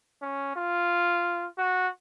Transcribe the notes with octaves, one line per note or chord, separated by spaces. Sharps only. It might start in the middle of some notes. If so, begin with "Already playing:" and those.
C#4
F4
F#4